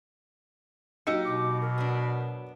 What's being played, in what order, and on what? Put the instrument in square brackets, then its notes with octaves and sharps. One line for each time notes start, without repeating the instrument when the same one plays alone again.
[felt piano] F#3 E6 C#7 [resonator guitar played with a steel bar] A#3 D#4 G4
[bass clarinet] B2 [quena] D6
[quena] A#4
[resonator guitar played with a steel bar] B3 D4